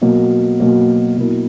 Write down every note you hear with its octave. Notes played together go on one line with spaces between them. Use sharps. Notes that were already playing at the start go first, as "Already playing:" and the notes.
B2 F#3 A#3
B2 F#3 A#3
B2 F#3 A#3 E4 A#4